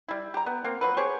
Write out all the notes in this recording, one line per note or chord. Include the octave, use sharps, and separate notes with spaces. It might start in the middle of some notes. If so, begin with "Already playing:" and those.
G3 E4
G4 A#5
B3
A#3 C4
F3 F#3 B4
G4 G#4 C5 C#5